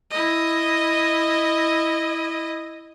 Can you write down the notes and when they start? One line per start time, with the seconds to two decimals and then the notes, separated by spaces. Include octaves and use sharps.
0.10 E4 D#5